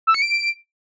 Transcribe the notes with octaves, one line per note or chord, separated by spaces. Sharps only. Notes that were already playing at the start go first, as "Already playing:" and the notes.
E6
C#7
D7